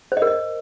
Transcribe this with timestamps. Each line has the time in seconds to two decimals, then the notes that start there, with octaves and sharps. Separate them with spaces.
0.12 C5
0.17 D#5
0.22 A#4
0.27 D#5